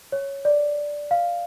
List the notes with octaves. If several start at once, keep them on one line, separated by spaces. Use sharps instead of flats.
C#5
D5
F5